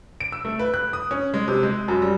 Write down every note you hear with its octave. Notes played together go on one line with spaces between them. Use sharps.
D7
E6
A3
B4
F#6
D#6
C#4
G#3
C3
G#3
F#2
G3